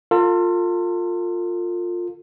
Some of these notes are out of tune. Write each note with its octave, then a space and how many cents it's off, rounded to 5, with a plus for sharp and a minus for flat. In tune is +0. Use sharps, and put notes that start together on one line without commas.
F4 +15 A4 +45